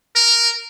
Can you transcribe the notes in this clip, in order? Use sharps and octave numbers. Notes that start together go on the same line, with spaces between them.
A#4